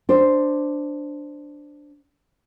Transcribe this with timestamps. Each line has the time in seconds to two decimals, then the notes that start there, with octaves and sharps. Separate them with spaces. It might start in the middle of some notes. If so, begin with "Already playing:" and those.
0.09 D4 C5